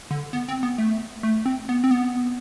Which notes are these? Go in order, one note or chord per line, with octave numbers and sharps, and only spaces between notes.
D3
B3
C4
B3
A3
A3
C4
B3
C4
B3